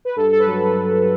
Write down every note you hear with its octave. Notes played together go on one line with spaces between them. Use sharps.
B4
G2 A4
A4
B4
F#3